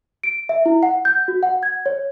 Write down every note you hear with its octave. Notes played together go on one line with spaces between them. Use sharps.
D7
E5
E4
F#5
G6
F#4
F#5
G#6
C#5